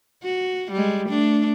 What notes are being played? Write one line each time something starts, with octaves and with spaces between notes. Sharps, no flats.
F#4
G3 G#3
A3 D4